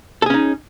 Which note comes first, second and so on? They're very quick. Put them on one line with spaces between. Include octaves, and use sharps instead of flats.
A4 G#4 C#4 D#4